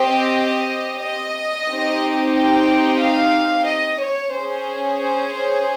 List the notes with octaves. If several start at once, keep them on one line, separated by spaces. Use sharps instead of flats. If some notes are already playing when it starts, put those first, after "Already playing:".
Already playing: C4 G4 D#5
D#5
C4 D#4 G4
G5
F5
D#5
C#5
C#4 G#4 C5
C5
C5